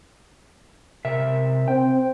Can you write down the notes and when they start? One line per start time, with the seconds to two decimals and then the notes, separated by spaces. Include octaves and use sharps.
1.05 C3 A#4 E5
1.68 C4 G5